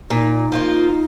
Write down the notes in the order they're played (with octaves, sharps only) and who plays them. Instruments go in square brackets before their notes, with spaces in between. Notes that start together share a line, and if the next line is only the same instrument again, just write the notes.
[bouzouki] A#2 [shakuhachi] D#4
[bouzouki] F3 A#3 F4